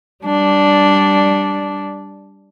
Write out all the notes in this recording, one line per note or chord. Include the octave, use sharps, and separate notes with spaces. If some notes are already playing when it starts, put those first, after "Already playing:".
G3 D4